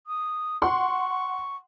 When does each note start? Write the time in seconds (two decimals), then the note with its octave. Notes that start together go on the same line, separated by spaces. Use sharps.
0.06 D#6
0.62 F#5 C6 C#6